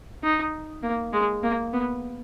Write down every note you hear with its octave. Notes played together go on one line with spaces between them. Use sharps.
D#4
A#3
G#3
A#3
B3